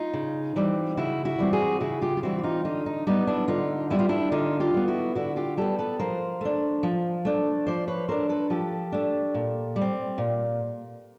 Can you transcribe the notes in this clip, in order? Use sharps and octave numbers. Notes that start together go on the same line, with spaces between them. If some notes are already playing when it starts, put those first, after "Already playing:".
Already playing: D#4 F4
C#3
E3 G3 C4
C#3 E4 F#4
E4 F#4
E3 G3 C4
F#4 G#4
C#3 E4 F#4
F4 G4
F4
E3 G3 C4 E4 F#4
F#4
D#4 F4
D3 D#4 F4
D#4
G3 B3 D#4
D4 E4
D3 D#4 F4
G3 B3 E4
F4
D4 E4
D3 D#4 F4
F4 G4
G3 B3
E4 F#4
D3 E4 F#4
F4 G4
G3 B3 G4 A4
A4 B4
F3 A#4 C5
A3 D4
F3
A3 D4
F3 C5 D5
B4 C#5
A3 D4 A#4 C5
A4 B4
F3 G4 A4
A3 D4
A#2
G3
C4
A#2